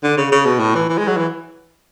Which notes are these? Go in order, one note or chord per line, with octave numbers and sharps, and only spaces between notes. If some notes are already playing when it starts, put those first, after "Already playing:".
D3
C#3
C#3
B2
A2
E3
E3
G#3
F#3
E3